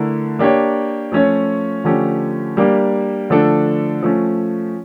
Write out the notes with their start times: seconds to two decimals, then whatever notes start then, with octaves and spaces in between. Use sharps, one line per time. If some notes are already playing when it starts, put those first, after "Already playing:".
Already playing: D3 A3 E4 A#4
0.39 A#3 D4 G4 C#5
1.12 F3 A3 C#4 F4 C#5
1.84 D3 F3 A3 C#4 G4
2.57 G3 A#3 D4 G4
3.30 D3 F3 A3 D4 A4
4.02 F3 A3 C#4